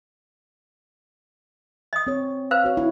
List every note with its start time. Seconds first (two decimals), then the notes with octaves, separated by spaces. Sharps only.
1.93 D#5 D#6
2.07 C4 C#5
2.51 B4 C5 F5
2.64 F#4 C#5
2.77 D#4 E4